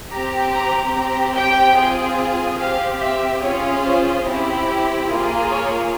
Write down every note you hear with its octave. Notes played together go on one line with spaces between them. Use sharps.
C4 G4 A#5
A#5
C4 G4 A#5
G5
C4 F4 G#4
C4 G4 F5
E5
C#4 F4 G#4 C#5
C5
C4 E4 G4
A#3 F4 G#4
C#5